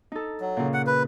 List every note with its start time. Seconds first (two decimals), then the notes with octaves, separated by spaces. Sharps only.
0.12 D#4 A4
0.40 F#3
0.57 A#2 C#3
0.74 F#5
0.87 B4